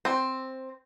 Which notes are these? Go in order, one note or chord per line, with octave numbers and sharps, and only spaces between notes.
C4